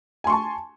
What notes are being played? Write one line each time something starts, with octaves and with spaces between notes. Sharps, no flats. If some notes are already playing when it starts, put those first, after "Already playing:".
G#5 A5 C6 C#6